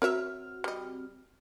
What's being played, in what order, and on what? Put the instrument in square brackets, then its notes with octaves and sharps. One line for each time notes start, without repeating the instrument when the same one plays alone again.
[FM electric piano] C4 F#4 F6 [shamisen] A#4 C#5 E5
[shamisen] G3 D#5